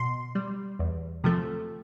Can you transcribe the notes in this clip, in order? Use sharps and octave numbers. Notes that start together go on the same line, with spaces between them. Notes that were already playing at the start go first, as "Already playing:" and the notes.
Already playing: B2 C6
G3
E2
C3 F3 A3